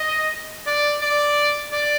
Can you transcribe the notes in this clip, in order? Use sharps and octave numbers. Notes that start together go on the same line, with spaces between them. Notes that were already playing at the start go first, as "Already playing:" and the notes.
Already playing: D#5
D5
D5
D5